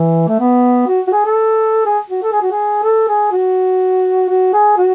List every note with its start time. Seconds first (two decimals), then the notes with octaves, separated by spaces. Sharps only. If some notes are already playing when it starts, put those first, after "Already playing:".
Already playing: E3
0.28 A3
0.40 B3
0.88 F#4
1.07 F#4
1.12 G#4
1.25 A4
1.86 G#4
2.10 F#4
2.23 A4
2.32 G#4
2.42 F#4
2.51 G#4
2.83 A4
3.08 G#4
3.31 F#4
4.29 F#4
4.53 G#4
4.77 F#4